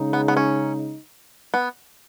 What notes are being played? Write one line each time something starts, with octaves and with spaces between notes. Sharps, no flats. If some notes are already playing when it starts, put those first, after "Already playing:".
Already playing: C#3 G#3 D#4
B3
B3
C#4
B3